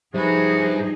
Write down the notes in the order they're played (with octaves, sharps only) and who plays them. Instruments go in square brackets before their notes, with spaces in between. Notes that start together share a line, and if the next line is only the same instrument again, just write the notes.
[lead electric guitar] G2 B4 [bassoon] C3 [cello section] F3 D#4 G#4 [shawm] F#4